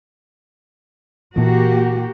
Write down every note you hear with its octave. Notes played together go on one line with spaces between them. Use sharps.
A#2 E3 A#3 F#4 G4